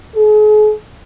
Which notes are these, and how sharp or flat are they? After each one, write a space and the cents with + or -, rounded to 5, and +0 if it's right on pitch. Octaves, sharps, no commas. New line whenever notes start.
G#4 +40